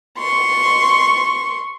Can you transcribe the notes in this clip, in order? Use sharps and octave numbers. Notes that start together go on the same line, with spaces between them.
C6 C#6